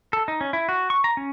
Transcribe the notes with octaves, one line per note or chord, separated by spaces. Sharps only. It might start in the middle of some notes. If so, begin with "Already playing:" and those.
A4
D#4
C#4
E4
F#4
C#6
A#5
C#4